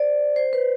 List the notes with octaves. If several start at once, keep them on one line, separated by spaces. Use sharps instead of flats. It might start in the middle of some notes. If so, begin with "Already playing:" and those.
Already playing: C5 D5
C5
B4